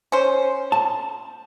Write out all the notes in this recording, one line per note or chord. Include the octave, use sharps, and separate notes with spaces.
C#4 C5
A5